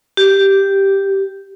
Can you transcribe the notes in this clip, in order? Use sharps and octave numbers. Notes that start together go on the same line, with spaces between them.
G4